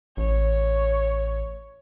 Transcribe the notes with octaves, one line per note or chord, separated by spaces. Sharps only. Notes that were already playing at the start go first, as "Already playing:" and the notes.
A1 C#5